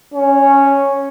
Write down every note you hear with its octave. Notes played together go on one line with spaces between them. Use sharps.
C#4